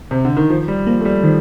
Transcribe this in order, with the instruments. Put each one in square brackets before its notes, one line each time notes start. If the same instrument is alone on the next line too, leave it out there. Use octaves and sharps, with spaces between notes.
[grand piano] C3
D3
D#3
[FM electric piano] D#3 [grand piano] F3
[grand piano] G3
[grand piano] F3 [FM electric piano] A#3
[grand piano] A3
G3
[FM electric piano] D#3 [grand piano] F3